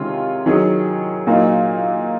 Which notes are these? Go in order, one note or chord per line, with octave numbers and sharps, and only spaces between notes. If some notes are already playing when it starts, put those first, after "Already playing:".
Already playing: C3 D#3 G#3 C#4 F4
D#3 F#3 C#4 G#4
A#2 F#3 A#3 D#4